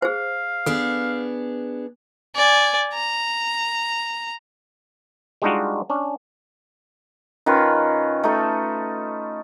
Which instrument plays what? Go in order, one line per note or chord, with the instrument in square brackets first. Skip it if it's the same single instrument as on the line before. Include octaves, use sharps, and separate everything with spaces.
[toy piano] G#4 C5 [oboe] F5
[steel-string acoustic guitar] B3 D4 G#4 [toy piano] A4
[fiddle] D5 G#5
A#5
[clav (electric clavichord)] G3 G#3 D4 D#4 F4 F#4
C#4 D4
[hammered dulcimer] D#3 C#4 F4 B4
A3 D#4 A4